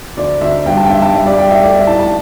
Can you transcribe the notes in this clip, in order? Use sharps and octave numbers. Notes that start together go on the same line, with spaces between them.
D2 D5
D2 E5
G2 G5
A5
G5
G2 E5
A5
G3 E5
D5
G3 G5
E5
A3 D5
E5
A2 A5
A5